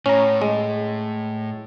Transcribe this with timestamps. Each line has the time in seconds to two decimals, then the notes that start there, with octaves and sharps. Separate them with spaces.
0.06 A2 C#4 A#5
0.42 G#3